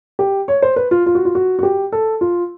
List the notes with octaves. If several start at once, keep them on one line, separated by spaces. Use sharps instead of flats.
G4
C#5
C5
B4
F4
F4
F#4
F4
F#4
F#4
G4
A4
F4